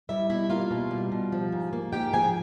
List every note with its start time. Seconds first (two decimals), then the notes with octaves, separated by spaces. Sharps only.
0.09 G3 E4 E5
0.30 B2 E4 E5
0.50 A#3 F4 F5
0.71 B2
0.91 G3
1.12 B2
1.32 F3
1.52 G#2
1.73 A#3
1.92 G#2 G4 G5
2.13 F3 G#4 G#5